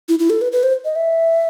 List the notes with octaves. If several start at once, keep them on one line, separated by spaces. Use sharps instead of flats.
E4
E4
A4
B4
B4
C5
D#5
E5